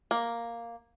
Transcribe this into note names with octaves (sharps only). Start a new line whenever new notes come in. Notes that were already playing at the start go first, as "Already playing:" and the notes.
A#3